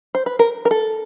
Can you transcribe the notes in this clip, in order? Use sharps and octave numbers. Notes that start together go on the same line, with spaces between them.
C5
B4
A#4
A#4
A4